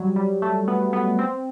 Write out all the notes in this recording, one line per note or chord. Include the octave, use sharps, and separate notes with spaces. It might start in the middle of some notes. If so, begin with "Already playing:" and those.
Already playing: F#3 G3
G3
A3
B3
B3
C4